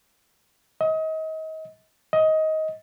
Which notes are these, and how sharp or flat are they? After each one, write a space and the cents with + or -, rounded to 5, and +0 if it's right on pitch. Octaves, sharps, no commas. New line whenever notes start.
D#5 +35
D#5 +20